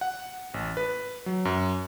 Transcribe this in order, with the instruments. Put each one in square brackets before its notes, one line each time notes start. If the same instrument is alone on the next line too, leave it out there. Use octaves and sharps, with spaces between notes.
[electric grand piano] F#5
A1
B4
F#3
F#2